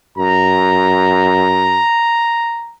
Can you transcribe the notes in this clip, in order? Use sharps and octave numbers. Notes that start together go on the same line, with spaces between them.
F#2 A#5